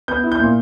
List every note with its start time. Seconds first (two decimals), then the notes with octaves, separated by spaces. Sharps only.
0.08 B3 G6
0.24 E4
0.32 G6
0.40 A#2